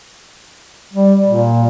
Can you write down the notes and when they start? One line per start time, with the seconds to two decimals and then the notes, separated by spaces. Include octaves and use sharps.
0.93 G3
1.27 A#2